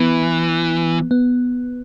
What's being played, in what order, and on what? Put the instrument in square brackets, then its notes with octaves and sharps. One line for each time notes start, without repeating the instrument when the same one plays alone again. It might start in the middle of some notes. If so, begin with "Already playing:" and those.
Already playing: [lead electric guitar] E3 [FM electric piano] B3
[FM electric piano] B3